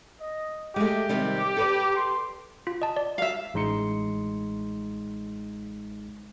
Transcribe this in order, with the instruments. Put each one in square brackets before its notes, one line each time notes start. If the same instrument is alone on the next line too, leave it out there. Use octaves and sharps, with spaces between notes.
[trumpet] D#5
[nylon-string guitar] G#3 A3 [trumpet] G4
[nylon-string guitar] C3 D#3 G3
A4 B4 D5
[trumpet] C6
[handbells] F4
D#5 A5
D5
[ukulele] E5 F5
[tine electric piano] A1 G#3 D#4 C6 C#7